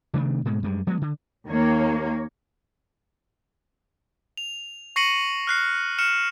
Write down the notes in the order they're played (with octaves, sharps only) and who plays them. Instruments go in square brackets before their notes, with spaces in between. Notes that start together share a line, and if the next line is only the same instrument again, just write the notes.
[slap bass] C3 D#3 A3 D4
G#2 B2 G#3
F#2 G3 G#3
F3 G#3 B3
D3
[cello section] D#2 A#3 C#5
[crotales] F7
C#6 A#6 C7 C#7 D#7 F#7
F6 F#6 C7
F6 C#7 E7